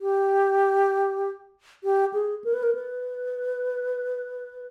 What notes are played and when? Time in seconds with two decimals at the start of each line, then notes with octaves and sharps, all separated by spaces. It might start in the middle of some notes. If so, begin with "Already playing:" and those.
0.01 G4
1.84 G4
2.13 G#4
2.44 A#4
2.54 B4
2.63 A#4
2.75 B4